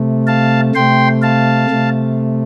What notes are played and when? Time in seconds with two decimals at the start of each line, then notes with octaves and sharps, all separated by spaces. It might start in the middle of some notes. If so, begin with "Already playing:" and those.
Already playing: C3 A3
0.27 F5 A5
0.75 C3 A3 G5 C6
1.22 F5 A5
1.70 C3 A3